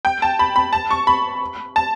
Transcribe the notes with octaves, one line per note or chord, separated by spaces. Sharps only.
G5
A5
B5
B5
A5
C#6
B5
A5